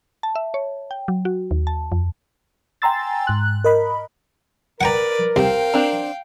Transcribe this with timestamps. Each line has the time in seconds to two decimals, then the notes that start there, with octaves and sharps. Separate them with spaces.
0.23 A5
0.35 E5
0.54 C#5
0.91 G5
1.08 F#3
1.25 F#4
1.51 D#2
1.67 A5
1.92 F2
2.82 G5 G#5 A#5 C6 E6 A6
3.27 G#2 F#6
3.64 A#4 D#5 B5
4.81 A#4 B4 D5 F#5 G5 A#5
5.36 C2 C4 F5 G5
5.74 C4 D4 A#5